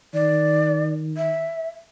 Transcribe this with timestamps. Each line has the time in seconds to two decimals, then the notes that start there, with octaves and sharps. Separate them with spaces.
0.14 D#3 D5
1.17 E5